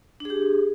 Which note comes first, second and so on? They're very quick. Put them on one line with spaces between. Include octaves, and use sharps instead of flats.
D4 G#4 G4